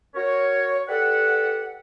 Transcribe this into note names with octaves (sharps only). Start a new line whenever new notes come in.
F#4 A#4 C#5
G4 A4 B4 D5 F#5